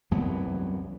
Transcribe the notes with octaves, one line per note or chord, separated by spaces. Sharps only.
C2 F#2 E3 B3